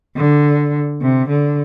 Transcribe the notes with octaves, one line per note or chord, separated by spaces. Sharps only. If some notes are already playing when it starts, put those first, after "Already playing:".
D3
C3
D3